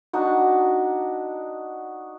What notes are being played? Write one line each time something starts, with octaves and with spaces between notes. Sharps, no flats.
D4 D#4 F#4